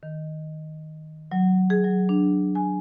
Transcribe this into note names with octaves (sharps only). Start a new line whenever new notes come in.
D#3
F#3
G#4
F#3
D4
G#5